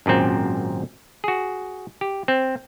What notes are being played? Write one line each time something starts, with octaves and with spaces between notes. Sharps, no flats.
G#1 F#2 A#2 C4
F#4 G#4
G4
C4